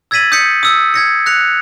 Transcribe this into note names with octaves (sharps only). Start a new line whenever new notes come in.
E6 G#6 A6 B6 D#7 F#7
D#6 G6 G#6 B6 C#7
D#6 E6
G#6 A#6 C#7
F#6 A#6 C#7 F7